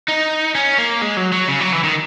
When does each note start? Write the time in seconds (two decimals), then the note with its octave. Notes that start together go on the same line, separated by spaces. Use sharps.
0.09 D#4
0.55 C#4
0.78 A#3
1.02 G#3
1.17 F#3
1.32 F#3
1.48 C#3
1.61 F#3
1.72 E3
1.84 D#3